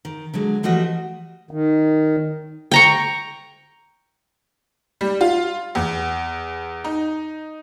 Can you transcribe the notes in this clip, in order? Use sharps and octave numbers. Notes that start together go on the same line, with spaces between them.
D#3
D3 F#3 G#3
E3 F3 G3 A3 F#4 D#5
D#3
G5 A#5 C#6
G3
F4
E2
D#4